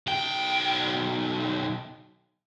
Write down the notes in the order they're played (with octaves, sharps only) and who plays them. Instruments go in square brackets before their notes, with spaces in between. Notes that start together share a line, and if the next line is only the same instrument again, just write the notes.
[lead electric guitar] B1 G5